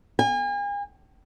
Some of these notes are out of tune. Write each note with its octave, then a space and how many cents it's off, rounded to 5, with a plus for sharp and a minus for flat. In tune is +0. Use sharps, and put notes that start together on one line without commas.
G#5 -40